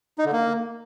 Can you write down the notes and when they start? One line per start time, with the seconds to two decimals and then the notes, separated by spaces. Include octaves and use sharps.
0.18 D#4
0.25 D3
0.32 A#3